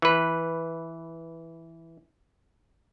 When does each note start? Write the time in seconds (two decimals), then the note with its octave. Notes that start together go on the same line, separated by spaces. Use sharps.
0.02 E3 B4